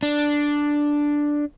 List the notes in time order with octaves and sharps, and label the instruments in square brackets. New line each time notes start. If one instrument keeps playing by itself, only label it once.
[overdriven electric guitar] D4